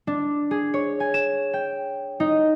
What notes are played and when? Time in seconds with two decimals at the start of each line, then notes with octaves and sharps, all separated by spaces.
0.07 D4
0.51 G#4
0.74 C#5
1.00 G#5
1.14 E7
1.54 G5
2.20 D#4